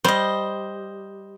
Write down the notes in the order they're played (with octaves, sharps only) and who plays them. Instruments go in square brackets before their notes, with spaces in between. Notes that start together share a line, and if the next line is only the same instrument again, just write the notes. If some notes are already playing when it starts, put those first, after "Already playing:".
[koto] G3 [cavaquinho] C5 D#5